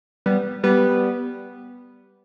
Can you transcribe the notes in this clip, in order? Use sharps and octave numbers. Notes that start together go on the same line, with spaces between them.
G3 B3
G3 B3